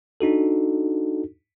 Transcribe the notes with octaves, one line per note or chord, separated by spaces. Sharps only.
D4 D#4 F#4 A4